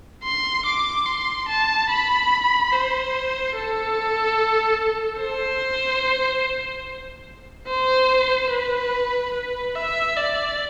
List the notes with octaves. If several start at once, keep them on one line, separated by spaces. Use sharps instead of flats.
C6
D6
C6
A5
B5
C5
A4
C5
C5
B4
B4
E5
D5